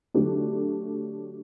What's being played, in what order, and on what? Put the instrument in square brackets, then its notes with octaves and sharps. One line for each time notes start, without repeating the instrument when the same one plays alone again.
[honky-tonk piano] D3 F#3 A3 D4 G4